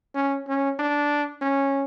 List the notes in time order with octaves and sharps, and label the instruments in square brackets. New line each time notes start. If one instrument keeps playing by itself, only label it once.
[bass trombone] C#4
C#4
D4
C#4